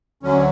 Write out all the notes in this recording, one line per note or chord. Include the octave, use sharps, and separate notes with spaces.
D2 D3 F#3 C#4